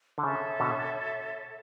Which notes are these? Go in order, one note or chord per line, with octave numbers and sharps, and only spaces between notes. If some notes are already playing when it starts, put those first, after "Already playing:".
D3
C#3 A4 C#5 E5
B2 D3